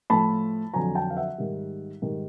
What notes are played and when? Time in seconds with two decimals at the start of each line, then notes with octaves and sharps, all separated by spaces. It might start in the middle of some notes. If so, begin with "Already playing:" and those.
0.10 A2 F3 A3 A5 B5
0.74 F2 D3 F#3 G#5 A#5
0.95 G5 A5
1.10 F5
1.16 E5 F#5
1.38 G#2 D#3 G3
2.02 G#2 D#3 G3